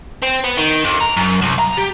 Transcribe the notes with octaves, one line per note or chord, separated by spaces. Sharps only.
C4
B3
D#3
F2
A#5
F#2
C2
A#5
G4